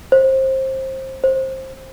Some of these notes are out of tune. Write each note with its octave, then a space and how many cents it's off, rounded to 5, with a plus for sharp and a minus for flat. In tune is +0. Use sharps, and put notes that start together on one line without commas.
C5 +20
C5 +15